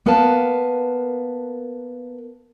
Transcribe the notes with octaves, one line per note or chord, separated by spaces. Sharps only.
A#3 B3 A#4 B4 F5 A5